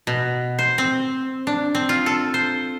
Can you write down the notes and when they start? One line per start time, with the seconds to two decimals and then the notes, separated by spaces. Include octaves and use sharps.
0.07 B2
0.59 C5
0.78 C4
1.47 D4
1.75 C4
1.89 F4
2.06 A4
2.34 C5